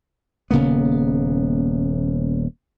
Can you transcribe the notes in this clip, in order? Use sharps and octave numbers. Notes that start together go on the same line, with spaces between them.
D#1 C#3 A#3 B3